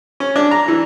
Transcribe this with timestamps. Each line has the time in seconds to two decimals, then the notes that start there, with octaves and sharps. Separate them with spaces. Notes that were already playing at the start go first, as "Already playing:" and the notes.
0.20 C#4
0.36 D4
0.51 A#5
0.68 E3